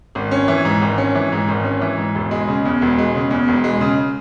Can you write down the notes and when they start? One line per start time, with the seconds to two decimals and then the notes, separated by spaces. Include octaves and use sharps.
0.15 G#1
0.31 C#4
0.48 E3
0.65 G#2
0.81 G#1
0.98 C#4
1.15 E3
1.32 G#2
1.48 G#1
1.64 C#4
1.81 E3
1.97 G#2
2.15 E1
2.31 G#3
2.47 C#3
2.65 E2
2.82 E1
2.98 G#3
3.15 C#3
3.31 E2
3.48 E1
3.64 G#3
3.81 C#3